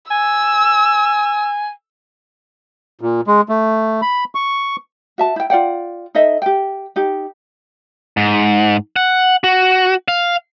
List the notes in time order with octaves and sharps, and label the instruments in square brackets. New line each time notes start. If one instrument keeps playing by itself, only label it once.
[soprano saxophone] G#5 [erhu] E6
[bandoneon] A#2
G#3
A3
B5
C#6
[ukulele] F#4 E5 A5
E4 G5
F4 D5 F#5 G5
D#4 A4 D#5 E5
G4 G5
D#4 G4
[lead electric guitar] G#2
F#5
F#4
F5